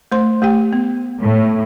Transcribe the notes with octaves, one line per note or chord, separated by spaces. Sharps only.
A3 C5 C6
A3 G4 G5
B3
A2